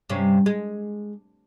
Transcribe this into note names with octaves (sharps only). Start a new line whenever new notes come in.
G2 C3 C#4
G#3